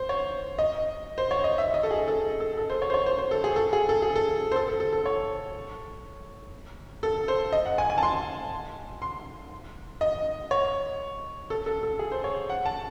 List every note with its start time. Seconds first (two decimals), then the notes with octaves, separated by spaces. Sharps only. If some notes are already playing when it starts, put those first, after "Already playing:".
Already playing: C5
0.09 C#5
0.59 D#5
1.18 C5
1.31 C#5
1.44 D#5
1.58 E5
1.74 D#5
1.83 A4
1.91 G#4
2.08 A4
2.40 A4
2.57 A4
2.70 C5
2.82 C#5
2.90 C5
2.94 C#5
3.06 C5
3.18 C5
3.31 A4
3.44 G#4
3.56 A4
3.73 G#4
3.89 A4
4.02 G#4
4.16 A4
4.52 C5
4.56 A4
4.68 A4
4.80 A4
4.93 A4
5.06 C#5
7.03 A4
7.28 C5
7.52 D#5
7.65 F#5
7.78 G#5
7.90 G#5
7.98 A5
8.03 C6
9.02 C6
10.01 D#5
10.51 C#5
11.50 A4
11.66 A4
11.83 A4
11.99 G#4
12.12 C5
12.24 C#5
12.50 F#5
12.66 A5